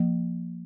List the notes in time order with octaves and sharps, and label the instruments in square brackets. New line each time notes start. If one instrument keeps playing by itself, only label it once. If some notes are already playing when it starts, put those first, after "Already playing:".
Already playing: [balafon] F3 A#3